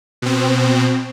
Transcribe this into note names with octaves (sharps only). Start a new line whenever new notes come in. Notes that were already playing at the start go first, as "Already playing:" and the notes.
B2 C4